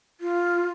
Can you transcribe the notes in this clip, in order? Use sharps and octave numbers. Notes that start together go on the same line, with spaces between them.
F4